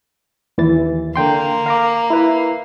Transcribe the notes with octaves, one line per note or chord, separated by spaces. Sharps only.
D#2 E3 A6
D3 A#3 G5 C6
F5 A#5 D6
E4 B4